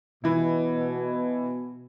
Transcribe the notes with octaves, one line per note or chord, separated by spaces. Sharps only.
B2 E3 E4